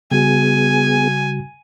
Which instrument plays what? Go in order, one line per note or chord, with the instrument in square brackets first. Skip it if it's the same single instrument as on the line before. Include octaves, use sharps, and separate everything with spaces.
[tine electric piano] C#3 G3 F#4 [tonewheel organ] B3 G#4 [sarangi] G#5